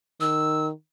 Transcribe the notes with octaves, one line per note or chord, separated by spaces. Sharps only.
D#3 E6